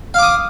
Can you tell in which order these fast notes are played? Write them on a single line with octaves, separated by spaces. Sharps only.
F5 D6 D#6